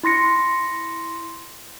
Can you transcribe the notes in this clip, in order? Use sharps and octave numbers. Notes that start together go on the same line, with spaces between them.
E4 C6 A#6 C#7